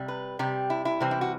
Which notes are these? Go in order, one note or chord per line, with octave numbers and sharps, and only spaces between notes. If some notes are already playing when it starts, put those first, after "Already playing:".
Already playing: C3 G3
B4
C3 G3 G4
E4
E4
C3 E3 G3 C4
E4
F#4